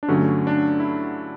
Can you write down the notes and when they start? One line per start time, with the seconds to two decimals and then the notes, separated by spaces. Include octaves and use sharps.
0.03 D4
0.08 G2 D3 F#3 A3 C#4
0.47 D4
0.80 E4